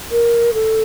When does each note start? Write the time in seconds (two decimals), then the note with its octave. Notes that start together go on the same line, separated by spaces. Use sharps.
0.11 A#4
0.54 A4